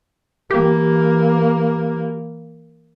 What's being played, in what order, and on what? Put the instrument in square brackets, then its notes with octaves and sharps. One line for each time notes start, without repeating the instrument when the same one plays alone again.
[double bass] E3 A#3 [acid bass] G4